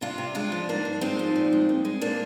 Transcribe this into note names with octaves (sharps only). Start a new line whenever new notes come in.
C3 D4 F4
C3
G#3 D4 F4
F3
G#2 A#3 D4
G#2
G#3 C4 D#4
F3
A#2
G#3
A#2
G#3
A#2 A#3 D4